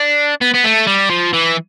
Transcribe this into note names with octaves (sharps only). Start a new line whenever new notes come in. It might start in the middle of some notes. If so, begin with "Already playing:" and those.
Already playing: D4
B3
B3
A3
G3
F3
E3